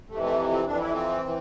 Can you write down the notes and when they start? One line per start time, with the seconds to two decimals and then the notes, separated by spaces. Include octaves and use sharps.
0.09 F2 C3 E3 A3
0.23 A3
0.52 C4
0.66 F2 E3 D4
0.80 E4
0.94 C4
1.25 E3